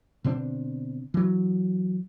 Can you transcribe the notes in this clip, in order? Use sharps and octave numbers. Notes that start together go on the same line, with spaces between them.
B2 D3 C4 D4
E3 F#3